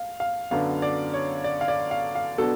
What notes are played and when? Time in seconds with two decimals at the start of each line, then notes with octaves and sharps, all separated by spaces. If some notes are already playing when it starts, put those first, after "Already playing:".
Already playing: F5
0.20 F5
0.51 F#2 D3 F#3 B3 D4 F5
0.82 D5
1.14 C#5
1.44 D5
1.61 F5
1.68 D5
1.91 F5
2.15 F5
2.38 B2 F#3 B3 D4 A4